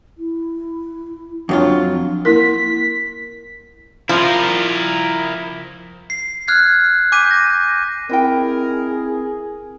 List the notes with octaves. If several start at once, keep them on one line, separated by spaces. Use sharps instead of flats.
E4
F2 F#3 D4 F4
A#3 E4 A#4 B6
F3 E4 A#4
C7
F6 F#6 G#6 C7
G#5 D6 G6 B6 D#7
A#6
C4 E4 G#4 A#4 D#5 G5